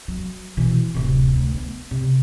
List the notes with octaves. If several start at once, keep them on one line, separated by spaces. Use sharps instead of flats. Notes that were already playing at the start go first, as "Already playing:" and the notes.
F#3
B2 E3
D1 C3
D2
B3
C3